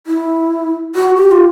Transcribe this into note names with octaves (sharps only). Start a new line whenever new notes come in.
E4
F#4
G4
F4